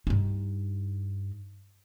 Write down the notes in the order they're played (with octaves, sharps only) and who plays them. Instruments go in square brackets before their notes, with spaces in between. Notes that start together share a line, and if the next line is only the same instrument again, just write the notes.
[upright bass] G2 D#4